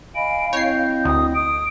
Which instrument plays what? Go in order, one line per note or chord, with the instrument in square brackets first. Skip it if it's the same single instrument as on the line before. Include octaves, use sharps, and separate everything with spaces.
[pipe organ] D#5 G#5 B5 [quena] F5 [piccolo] D7
[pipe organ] C4 E4 D#5 [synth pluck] C#5 C7 [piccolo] G6
[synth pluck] D2 [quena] D#6
[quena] D#6 [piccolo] D7